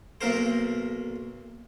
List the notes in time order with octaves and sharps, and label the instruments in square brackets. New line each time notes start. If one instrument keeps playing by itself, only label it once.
[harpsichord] B1 A#3 A#4 C5